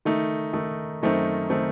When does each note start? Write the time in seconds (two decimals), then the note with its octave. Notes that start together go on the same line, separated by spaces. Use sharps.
0.05 D#3 A3 D#4
0.53 D#3 A3 D#4
1.02 F#2 D#3 A3 C4 D#4
1.50 D#3 A3 C4 D#4